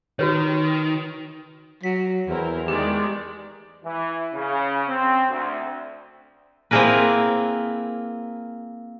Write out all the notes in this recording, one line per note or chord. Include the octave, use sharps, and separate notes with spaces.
D#3 F#4 B4 C#5
F#3 B6
E2 C4 E4 A#4
D#3 G#3 G4 D5
E3
C#3
C4
D2
A#3 C4 E4 G#4 A#4 B4